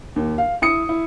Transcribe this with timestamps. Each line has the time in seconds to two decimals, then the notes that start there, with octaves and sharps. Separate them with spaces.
0.16 D#2
0.38 F5
0.62 E4 D#6 C#7
0.89 E4